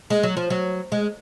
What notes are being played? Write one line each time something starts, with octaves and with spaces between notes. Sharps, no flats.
G#3
F#3
F3
F#3
G#3